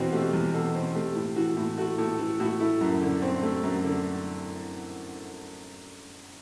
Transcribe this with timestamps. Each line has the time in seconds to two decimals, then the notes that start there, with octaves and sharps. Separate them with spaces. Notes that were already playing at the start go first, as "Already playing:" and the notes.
Already playing: E2 B2 C4 F#4
0.13 A3 G4
0.33 E2
0.54 B2 A4
0.75 C4
0.95 A3 G4
1.16 A2
1.36 E3 F#4
1.57 A2
1.78 A3 F#4
1.98 A2 A4
2.19 E3
2.40 A2 F#4
2.60 A3 E4
2.81 F#2
3.01 D3
3.22 C4
3.43 A3
3.63 F#2
3.84 D3